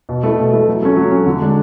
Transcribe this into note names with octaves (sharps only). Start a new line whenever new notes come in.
B2
A3 E4
B2
A3 E4
F#3
A3 C#4
F#3
C#4
A3
D3
G#3 D4